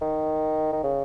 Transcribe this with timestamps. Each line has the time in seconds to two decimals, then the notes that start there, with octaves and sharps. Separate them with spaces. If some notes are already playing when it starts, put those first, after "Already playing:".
0.02 D#3
0.73 D#3
0.83 C#3